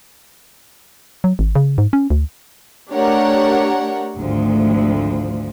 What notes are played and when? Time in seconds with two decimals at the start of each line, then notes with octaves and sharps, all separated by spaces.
1.24 F#3
1.39 G#1
1.55 C#3
1.78 G#2
1.93 C#4
2.10 D2
2.91 A3 D4 G4 A#4 C#5 F#5
4.15 G#1 D2 F3